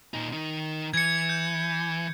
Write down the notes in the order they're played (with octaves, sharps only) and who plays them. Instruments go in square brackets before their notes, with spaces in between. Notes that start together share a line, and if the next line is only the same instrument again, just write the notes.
[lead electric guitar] A#2 D#4
D#3 D#4
[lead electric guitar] E3 [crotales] G#6 C#7
[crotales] G6